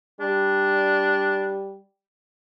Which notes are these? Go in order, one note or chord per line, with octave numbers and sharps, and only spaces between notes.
G3 D4